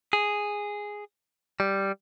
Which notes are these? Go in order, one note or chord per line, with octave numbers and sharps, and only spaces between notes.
G#4
G3